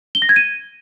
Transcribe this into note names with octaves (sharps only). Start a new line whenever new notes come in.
G7
A#6
G#6
D#7